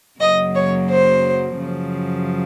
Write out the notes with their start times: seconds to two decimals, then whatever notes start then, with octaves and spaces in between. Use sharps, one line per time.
0.19 F#2 C#3 F#3 A#3 D#5
0.55 C#5
0.90 C5
1.60 F#2 C#3 F3